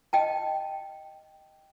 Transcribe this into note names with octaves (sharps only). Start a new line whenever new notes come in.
D#5 G5 A5